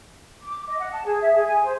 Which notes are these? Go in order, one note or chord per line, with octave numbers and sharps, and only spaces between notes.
D6
D#5
F#5
A5
G#4
E5
G#4
G#5
C5